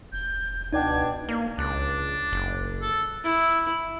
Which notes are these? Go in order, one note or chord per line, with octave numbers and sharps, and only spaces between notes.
F1 G6
C#2 B2 D4 D#4 D5 G5 G#6
A#3
C#2 D4
F#1
A4
E4